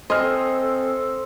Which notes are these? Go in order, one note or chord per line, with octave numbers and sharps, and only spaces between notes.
C4 A4 C5 D#5 G#5 F6